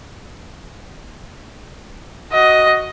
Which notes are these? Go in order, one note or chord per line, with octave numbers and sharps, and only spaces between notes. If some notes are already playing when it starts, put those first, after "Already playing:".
F#4 D#5